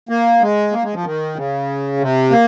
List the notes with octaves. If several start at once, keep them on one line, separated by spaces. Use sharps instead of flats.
A#3
G#3
A#3
G#3
F3
D#3
C#3
C3
A#3